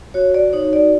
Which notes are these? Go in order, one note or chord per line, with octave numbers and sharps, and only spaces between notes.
F#4 C#5
D5
D#4 C#5
D5